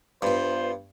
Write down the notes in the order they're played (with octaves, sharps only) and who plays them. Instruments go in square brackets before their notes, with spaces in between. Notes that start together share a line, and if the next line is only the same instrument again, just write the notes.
[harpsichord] G2 [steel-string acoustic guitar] B3 F4 [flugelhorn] C5